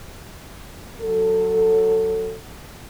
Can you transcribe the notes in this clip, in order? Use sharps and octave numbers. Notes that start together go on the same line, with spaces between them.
F#3 A4